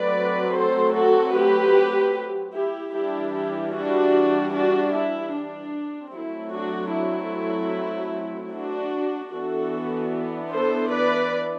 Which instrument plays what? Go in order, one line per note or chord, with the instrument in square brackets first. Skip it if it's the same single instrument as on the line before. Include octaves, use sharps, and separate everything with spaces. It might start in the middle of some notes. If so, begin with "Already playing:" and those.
Already playing: [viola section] F#3 A3 C4 B4 D5
A4 C5
F#4 A4
G4 B4
E4 G4
E3 G3 D4 E4 G4
E4 G4
D4 F#4
D4 F#4
E4
D4
F#3 A3 C4 E4
D4 F#4
E4
D4 F#4
E3 B3 D4 F#4 A4
A4 C5
B4 D5